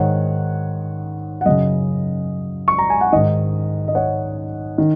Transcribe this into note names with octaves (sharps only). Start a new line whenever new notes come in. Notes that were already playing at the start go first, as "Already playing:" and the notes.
Already playing: G#2 D#3 C#5 F#5
F#5
F#2 C#3 D#5
C#6
A#5
G#5
F#5
G#2 D#3 D#5
D#5
C#5 F#5
D#3